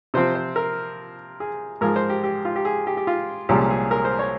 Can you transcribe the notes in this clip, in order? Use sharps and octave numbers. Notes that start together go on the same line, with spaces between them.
C3 F3 C4 C5
C5
A#4
G#4
G#2 F3 G#3 A#4
C5
G4
G4
F4
G4
G#4
G4
G4
F4
C2 A#2 F3 G#3 C#4 G4
G#4
A#4
C5
C#5